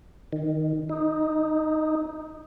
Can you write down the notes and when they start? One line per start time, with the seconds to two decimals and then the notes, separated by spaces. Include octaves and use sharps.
0.33 D#3
0.89 D#4